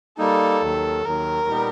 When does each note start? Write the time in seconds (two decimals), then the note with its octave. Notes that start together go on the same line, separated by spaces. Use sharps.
0.18 G3 A#3 D#4 A4
0.62 D#2 D#3 F#3
1.05 D#2 D#3 F#3 A#4
1.48 A#2 G3 B3 D#4 G4